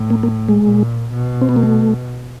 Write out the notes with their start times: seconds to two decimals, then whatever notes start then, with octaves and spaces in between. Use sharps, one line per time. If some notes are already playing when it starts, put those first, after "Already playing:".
Already playing: A2
0.10 A#3
0.23 A#3
0.49 G#3
0.62 A#2
1.12 B2
1.42 C4
1.49 B3
1.56 A#3
1.63 A3